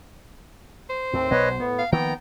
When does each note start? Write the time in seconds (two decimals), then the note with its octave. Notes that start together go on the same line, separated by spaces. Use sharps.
0.90 C5
1.13 D#2 A2 C4
1.31 B1 B2 B3 B4 C#5 D#5
1.59 A2 B3
1.79 F5
1.92 D#3 F3 A#3 B3 G5 A#5